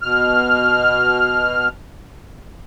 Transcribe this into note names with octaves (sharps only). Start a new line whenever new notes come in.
B2 F6